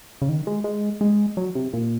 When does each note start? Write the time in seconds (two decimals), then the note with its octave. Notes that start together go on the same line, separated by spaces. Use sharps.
0.22 C#3
0.29 D#3
0.47 G#3
0.64 G#3
1.01 G#3
1.37 F#3
1.55 C3
1.73 A#2